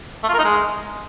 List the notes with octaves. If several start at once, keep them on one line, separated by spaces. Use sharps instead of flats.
A3
F4
A#4
D#4
G#3